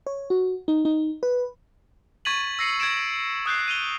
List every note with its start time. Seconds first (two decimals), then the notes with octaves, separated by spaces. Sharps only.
0.06 C#5
0.30 F#4
0.68 D#4
0.85 D#4
1.23 B4
2.25 C#6 G#6 A6 B6 D#7 F#7
2.59 E6 A#6 C7 C#7 D#7
2.80 G#6 A6 D7 E7
3.46 D#6 F#6 G6 C7
3.68 D#7 F7 G7